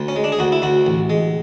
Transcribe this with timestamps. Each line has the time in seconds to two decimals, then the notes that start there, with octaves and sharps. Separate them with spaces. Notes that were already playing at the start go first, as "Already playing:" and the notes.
Already playing: D2
0.08 C#4
0.16 G#3
0.24 D4
0.32 G#4
0.39 D2 F#4
0.52 E4
0.62 D2 F#4
0.86 A1
1.10 G#3